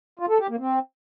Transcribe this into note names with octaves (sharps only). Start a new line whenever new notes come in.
F4
A4
G4
A#3
C4